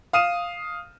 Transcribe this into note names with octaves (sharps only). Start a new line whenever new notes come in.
F5 D#6 D#7 E7